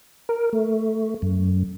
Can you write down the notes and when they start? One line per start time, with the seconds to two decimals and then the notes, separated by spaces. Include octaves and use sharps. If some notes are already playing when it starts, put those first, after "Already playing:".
0.29 A#4
0.53 A3
1.22 F#2